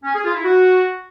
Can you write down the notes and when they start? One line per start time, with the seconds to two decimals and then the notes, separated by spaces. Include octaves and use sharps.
0.03 C#4
0.13 G#4
0.23 F4
0.33 E4
0.43 F#4